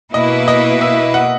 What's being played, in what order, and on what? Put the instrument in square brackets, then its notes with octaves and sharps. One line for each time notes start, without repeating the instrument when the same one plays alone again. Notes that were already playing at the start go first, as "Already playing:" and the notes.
[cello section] B2 A#3 E4 B4 [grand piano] D#5
[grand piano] D#5
E5
F#5